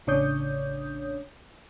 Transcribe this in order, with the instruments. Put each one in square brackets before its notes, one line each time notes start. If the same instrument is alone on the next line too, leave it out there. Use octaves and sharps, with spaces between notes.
[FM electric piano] A1 C#3 D4 C#5 D#6 G6